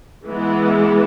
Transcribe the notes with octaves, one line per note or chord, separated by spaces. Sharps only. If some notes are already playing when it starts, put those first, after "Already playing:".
E3 G#3 B3